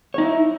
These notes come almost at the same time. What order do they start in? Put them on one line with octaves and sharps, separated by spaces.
C#5 D#4 E4